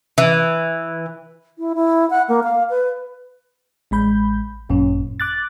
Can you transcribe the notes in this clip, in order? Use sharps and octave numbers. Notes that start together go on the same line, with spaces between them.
E3
E4
E4
F#5
A#3
F5
B4
A1 G#3 B5 G6
G#1 F#2 A#2 C#4
D6 F#6 A6